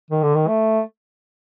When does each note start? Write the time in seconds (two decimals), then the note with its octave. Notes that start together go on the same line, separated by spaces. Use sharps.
0.11 D#3
0.23 D3
0.35 D#3
0.48 A3